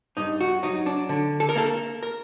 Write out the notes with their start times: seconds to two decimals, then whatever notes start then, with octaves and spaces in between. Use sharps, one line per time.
0.17 G2 D#4
0.41 F#4
0.63 F#3 D#4
0.86 D4
1.09 D3
1.40 A4
1.49 A#4
1.55 A#3 A4
2.03 A#4